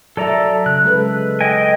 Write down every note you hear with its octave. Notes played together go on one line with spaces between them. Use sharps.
F#3 A4 D5 E5 A#5
C#3 F#6
G#3 A4 B4
D#5 G5 G#5